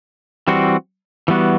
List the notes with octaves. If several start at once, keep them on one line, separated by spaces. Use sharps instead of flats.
E3 G3 C4 F#4
E3 G3 B3 F#4